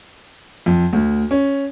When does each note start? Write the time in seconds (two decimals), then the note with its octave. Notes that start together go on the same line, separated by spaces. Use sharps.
0.66 F2
0.93 D2
1.31 C#4